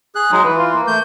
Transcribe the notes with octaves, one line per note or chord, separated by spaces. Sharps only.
G#4 F#6
F#3 G#3 D#4
E3 B4
F4
A#3
A3 G6